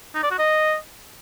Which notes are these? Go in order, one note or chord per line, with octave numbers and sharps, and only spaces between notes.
D#4
D5
F#4
D#5